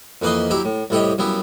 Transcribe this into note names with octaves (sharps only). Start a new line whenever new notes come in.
F2 E3 A#3 B4 D#5 C6
F#3 E4 G4 A#5 D6
A2
C2 A2 E4 G4 C#5 D#5
F#2 C#3 G3 B3 E4